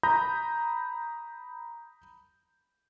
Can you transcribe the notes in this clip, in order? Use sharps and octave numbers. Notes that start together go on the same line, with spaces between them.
A#5 B5 D#6 G6 A#6